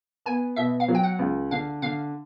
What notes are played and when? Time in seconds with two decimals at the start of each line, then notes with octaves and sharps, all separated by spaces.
0.26 B3 G#5
0.56 B2 E5
0.80 F5
0.88 F#3
0.95 G5
1.03 F#5
1.19 C#2
1.51 D3 F5
1.82 D3 F5